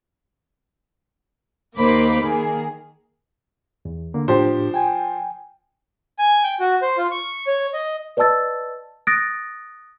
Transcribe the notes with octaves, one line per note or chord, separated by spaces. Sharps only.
D#2 A#3 D#4 C5 B5 D6
D#3 A#3 G#4
E2
D3 A#3
A2 F3 D4 G4 C5
G5 G#5
G#5
G5
F#4
C5
F4
C#6
C#5
D#5
B4 D5 D#5 A5 E6 A6
D#6 F#6 A6 A#6 D7